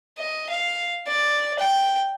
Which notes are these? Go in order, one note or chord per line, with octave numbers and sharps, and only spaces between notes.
D#5
F5
D5
G5